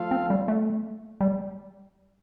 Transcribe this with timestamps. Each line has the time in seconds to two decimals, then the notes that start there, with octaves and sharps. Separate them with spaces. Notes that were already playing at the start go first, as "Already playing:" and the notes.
Already playing: F3 A3 F4 A4 F5
0.11 C4
0.30 G3
0.48 A3
1.20 G3